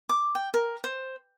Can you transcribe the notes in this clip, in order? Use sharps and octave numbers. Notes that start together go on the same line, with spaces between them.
D6
G5
A#4
C5